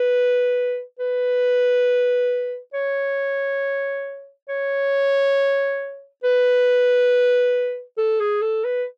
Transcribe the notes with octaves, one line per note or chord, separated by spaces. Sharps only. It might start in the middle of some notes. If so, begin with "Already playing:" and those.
Already playing: B4
B4
C#5
C#5
B4
A4
G#4
A4
B4